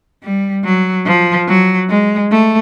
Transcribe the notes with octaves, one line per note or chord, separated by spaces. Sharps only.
G3
F#3
F3
F#3
G#3
A3